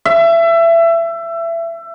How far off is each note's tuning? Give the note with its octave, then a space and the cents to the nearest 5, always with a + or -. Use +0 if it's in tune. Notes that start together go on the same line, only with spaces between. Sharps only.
E5 +25